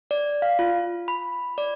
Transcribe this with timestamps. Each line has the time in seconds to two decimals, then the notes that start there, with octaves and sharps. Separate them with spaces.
0.11 D5
0.42 F5
0.59 F4
1.08 B5
1.58 D5